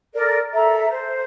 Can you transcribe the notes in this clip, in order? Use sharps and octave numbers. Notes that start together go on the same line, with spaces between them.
A4 A#4 D5
A4 E5 A#5
C5